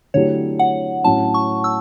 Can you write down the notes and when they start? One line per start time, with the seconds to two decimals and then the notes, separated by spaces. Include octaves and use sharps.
0.14 D3 F#3 A3 E4 G4 C#5
0.59 F#5
1.04 A2 F#3 C#4 A5
1.34 C#6
1.64 E6